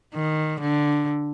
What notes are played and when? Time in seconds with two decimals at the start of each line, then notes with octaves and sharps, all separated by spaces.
0.14 D#3
0.60 D3